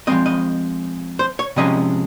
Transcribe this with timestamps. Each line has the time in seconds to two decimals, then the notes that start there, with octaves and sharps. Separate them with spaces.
0.07 F3 G#3 C4 D#5
0.26 D#5
1.19 C5
1.39 C#5
1.56 C3 F3 G#3 C#4 D#5